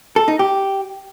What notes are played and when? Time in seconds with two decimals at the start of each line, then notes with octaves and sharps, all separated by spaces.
0.16 A4
0.28 D#4
0.39 G4